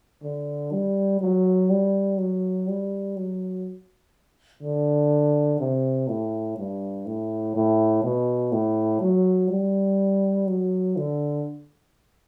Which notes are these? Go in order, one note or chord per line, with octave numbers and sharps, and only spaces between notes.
D3
G3
F#3
G3
F#3
G3
F#3
D3
C3
A2
G2
A2
A2
B2
A2
F#3
G3
F#3
D3